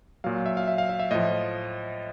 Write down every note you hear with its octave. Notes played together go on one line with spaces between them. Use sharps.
A#2 F#3 F5
E5
F5
E5
F5
E5
E5
A2 F3 D#5